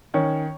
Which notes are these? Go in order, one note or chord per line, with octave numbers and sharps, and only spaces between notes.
D#3 C#4 C#5